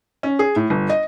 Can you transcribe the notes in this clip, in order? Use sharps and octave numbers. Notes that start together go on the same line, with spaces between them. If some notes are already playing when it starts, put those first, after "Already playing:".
C#4
G#4
A2
G1
D#5